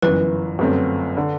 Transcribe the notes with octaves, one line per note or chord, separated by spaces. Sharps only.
G1 F#2 E3 B4
G1 F#2 F#3 A3 C4
D3